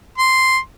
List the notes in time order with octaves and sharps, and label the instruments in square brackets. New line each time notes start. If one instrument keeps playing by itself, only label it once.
[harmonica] C6